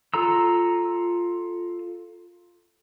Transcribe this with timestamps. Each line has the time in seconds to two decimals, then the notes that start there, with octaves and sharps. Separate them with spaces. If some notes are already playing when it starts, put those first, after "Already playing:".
0.14 F4 A4 A#5 E6